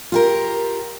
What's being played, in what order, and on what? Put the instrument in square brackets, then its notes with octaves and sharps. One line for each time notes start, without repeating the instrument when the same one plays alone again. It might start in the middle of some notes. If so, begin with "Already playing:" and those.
[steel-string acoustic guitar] F4 G4 A#4